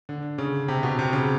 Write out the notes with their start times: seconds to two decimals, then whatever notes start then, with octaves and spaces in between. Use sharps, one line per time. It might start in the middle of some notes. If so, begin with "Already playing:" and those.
0.09 D3
0.38 C#3
0.68 C3
0.83 B2
0.99 C3
1.13 C#3